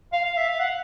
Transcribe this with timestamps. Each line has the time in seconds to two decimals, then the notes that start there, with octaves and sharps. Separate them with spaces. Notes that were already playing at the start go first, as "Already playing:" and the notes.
0.12 F5
0.24 F5
0.37 E5
0.48 F5
0.60 F#5